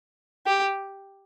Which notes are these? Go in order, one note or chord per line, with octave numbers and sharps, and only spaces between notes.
G4